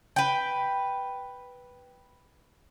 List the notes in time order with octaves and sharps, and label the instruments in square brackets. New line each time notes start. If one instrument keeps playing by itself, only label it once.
[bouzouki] B4 G5